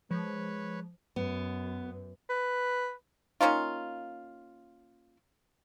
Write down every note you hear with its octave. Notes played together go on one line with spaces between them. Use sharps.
F3 G#3 B4 C#5
F#2 B3
B4
A#3 C#4 D#4 F4